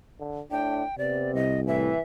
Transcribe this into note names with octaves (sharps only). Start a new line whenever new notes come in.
D3
A2 D4 G5
C3 B3 D5
C2 D#5
A2 E3 E5